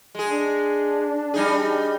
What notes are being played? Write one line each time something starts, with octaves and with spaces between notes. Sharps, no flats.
G#3 G#4
D4
G3 D#4 G#4